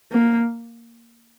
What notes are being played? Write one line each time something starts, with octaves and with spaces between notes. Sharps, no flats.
A#3